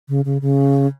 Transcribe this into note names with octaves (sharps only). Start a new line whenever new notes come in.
C#3
C#3
C#3